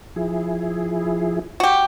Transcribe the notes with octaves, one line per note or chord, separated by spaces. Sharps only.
F3 E4 G#4
F#4 G4